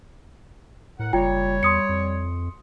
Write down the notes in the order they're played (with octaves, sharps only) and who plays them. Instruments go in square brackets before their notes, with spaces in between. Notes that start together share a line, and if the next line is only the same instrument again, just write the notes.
[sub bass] A2 [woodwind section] A#4 F#5
[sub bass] F#1 [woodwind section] G3 C#5 [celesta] F4 G5
[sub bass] E2 [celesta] C6 D#6 C#7
[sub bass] F2